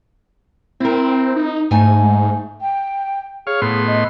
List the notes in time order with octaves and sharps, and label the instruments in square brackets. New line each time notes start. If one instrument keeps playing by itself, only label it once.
[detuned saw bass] C4 [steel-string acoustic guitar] E4 A#4
[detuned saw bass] D#4
[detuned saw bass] G#2 [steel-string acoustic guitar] A3 D#4 G#5
[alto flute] G5
[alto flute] G#4 [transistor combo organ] C#5 F5
[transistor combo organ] A2 B3 C6
[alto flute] D#5